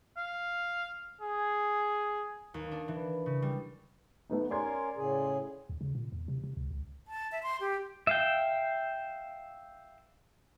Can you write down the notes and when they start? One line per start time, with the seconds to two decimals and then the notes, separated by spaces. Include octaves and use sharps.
0.17 F5
1.21 G#4
2.54 D#2
2.71 D4
2.88 E3
3.26 C#3
3.42 G3
4.30 A3 B3 D#4
4.50 C#4 A#4 D5 C6 G#6
4.96 A2 C#3 G#4
5.69 D#2
5.81 C#3
5.95 A#2
6.12 E2
6.28 C3
6.44 C3
6.57 C#2
6.71 C#2
7.08 A5
7.32 E5
7.43 C6
7.61 G4
8.07 E5 F5 G5